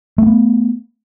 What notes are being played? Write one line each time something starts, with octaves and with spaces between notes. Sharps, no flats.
A3 B3 C4